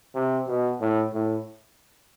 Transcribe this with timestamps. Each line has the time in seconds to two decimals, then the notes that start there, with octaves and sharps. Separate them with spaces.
0.14 C3
0.48 B2
0.81 A2
1.13 A2